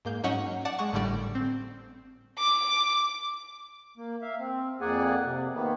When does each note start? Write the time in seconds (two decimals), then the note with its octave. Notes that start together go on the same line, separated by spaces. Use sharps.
0.05 G#2 A#3 G6
0.23 G#2 F#3 C#4 D#4 F#5 C#6
0.65 D5 F#5 A5
0.78 G#3 F#5 C#6
0.92 G#1 A2 D3 G3 D5
1.35 C4
2.39 D6
3.97 A#3
4.22 E5 F5
4.39 C4
4.81 F2 A#3 G#4 D5 F#5 G#5
5.25 C3
5.54 D#3 A#3 B3